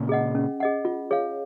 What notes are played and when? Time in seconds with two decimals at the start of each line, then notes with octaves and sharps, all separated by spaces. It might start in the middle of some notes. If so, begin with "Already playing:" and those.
Already playing: A#2 C#3
0.09 G#4 D#5 F#5
0.35 C#4
0.60 G#4 D#5 F#5
0.85 F4
1.11 G#4 C#5 F5